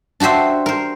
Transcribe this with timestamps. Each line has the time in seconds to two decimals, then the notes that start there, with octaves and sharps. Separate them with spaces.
0.20 D4 F#4 G4 C5 E5
0.66 A#4 C5